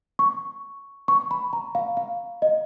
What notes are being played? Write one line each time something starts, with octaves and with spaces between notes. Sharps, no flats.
C#6
C#6
B5
A#5
F5
F5
D#5